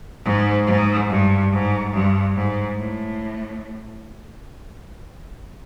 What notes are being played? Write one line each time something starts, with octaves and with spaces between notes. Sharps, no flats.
G#2
G#2
G2
G#2
G2
G#2
A2